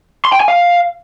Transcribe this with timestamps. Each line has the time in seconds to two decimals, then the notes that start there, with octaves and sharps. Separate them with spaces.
0.25 C6
0.33 G5
0.40 G#5
0.48 F5